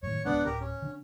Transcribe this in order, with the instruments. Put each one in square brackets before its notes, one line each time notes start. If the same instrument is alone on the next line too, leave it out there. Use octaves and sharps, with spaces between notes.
[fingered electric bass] F#2 A2 D#3 [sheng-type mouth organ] C#5
[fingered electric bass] D1 D3 G#3 [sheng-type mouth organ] B3 D4 F#5
[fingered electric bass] D1 [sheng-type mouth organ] G4 A#4
[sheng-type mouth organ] C#4
[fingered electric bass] D3 D4